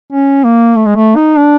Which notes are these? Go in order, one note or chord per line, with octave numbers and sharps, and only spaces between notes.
C#4
A#3
A3
G#3
A3
D#4
D4